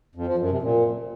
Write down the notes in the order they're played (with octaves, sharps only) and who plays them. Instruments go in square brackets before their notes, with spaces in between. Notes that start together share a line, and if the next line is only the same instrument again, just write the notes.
[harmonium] F2
F3
F#2
C3
A#2